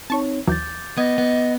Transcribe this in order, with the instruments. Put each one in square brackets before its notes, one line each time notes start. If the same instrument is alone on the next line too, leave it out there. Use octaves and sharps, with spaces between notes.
[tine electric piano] C4 D#4 C#5 [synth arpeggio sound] A5 C#6
[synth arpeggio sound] D#2 E3 F#3 [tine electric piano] D6 G6 A6
[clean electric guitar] B3 [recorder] D#5 [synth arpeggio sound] D#6 G#6
[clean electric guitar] B3